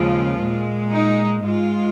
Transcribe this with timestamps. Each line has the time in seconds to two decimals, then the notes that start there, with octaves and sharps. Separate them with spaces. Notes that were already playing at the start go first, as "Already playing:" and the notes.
Already playing: D#2 C#3 F3 G#3 F4
0.37 A#2 G#3
0.90 D#4
1.43 G#2 G#3 F4